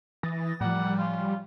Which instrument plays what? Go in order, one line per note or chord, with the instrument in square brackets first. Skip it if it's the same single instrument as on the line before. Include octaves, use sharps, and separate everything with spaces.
[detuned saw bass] E3 [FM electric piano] D#6 A6 A#6
[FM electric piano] A2 F3 [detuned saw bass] G3 [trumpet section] A#4 D5 F#5
[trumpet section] C#4 F4